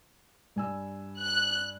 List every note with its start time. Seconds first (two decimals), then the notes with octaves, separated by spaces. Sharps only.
0.56 G2 G#5 E6
1.20 F#6